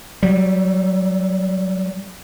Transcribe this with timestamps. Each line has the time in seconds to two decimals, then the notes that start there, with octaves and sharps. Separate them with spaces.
0.23 F#3 G3